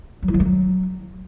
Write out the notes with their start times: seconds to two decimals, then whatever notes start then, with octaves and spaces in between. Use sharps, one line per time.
0.22 F#3
0.28 E4
0.34 F3
0.40 G#3
0.46 F#3